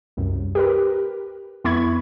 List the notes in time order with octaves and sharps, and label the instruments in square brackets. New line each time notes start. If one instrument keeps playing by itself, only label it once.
[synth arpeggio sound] C2 F#2
G4 A#4 B4
F2 B3 E4 B5 C#6 G#6